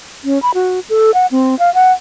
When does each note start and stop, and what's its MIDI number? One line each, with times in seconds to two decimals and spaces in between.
0.24 0.41 61
0.42 0.51 83
0.54 0.80 66
0.90 1.11 69
1.14 1.26 78
1.31 1.58 60
1.59 1.73 77
1.74 1.92 78